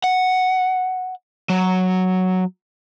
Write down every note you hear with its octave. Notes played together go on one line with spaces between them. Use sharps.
F#5
F#3